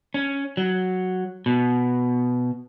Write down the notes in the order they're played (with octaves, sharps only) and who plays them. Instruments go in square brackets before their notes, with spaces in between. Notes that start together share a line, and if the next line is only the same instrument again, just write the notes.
[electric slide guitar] C#4
F#3
B2